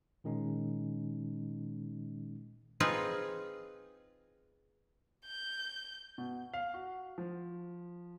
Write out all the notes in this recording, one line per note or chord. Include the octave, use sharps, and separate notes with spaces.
A#2 D#3 G#3 C#4 D#4
C4 D#4 F4 G#4 B4
G6
B2
F5
F#4
F3